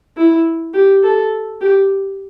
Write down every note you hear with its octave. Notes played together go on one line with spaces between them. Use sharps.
E4
G4
A4
G4